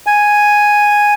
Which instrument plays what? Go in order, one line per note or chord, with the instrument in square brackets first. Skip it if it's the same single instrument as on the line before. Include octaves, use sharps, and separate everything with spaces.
[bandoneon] G#5